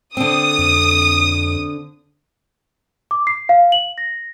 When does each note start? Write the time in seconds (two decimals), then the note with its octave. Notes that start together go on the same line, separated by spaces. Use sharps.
0.17 D3 C4 D#6
0.58 F2
3.11 D6
3.27 C7
3.49 F5
3.72 F#7
3.98 A#6